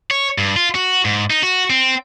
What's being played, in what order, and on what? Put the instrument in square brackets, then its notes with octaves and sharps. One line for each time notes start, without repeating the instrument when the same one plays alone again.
[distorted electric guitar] C#5
G2
F4
F#4
G#2
D#4
F#4
C4